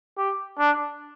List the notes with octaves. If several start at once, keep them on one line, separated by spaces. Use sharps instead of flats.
G4
D4